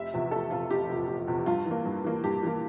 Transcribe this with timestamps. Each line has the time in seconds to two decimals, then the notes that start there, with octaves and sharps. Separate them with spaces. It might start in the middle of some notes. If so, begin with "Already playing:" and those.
Already playing: F1 E5
0.13 E2 C3 F3
0.31 F1 A4
0.50 E2 C3 F3 F4
0.70 F1 G4
0.89 E2 C3 F3
1.08 F1
1.28 E2 C3 F3
1.46 G2 F4
1.65 E3
1.71 A#3
1.85 G2
2.04 E3 A#3
2.24 G2 G4
2.43 E3 A#3